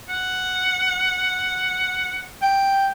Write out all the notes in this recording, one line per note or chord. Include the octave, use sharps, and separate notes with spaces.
F#5
G5